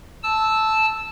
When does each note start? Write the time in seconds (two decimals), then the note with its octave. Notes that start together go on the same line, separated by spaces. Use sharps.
0.23 A5 E6